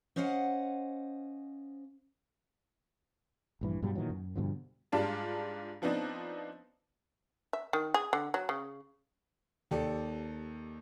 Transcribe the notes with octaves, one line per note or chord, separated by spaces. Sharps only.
C#4 C5 D#5 F5 F#5
A#1 G2 E3
G2 B2 F#3 G3
A#2 D#3 E3 F#3
F#2
G2 B2 D3 F3
G#2 G3 D4 F4 A5
F3 B3 C4 D4 D#4
E5
D#3
G#4
D3
F#3
C#3
D#2 G4 A4 D5